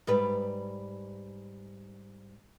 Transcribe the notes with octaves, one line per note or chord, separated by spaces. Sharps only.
G#2 G3 B4